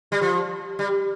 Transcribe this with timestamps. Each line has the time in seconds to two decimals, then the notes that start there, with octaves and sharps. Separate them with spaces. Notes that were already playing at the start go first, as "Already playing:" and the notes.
0.12 G3
0.22 F3
0.79 G3